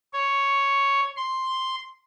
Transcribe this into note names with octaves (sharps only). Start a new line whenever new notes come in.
C#5
C6